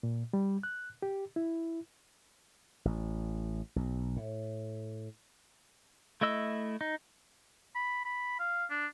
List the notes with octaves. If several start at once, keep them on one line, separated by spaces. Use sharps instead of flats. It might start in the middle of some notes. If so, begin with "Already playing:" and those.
A#2
G3
F#6
G4
E4
A1
B1
A2
A3 E4 D#5 E6
D#4
B5
B5
F5
D4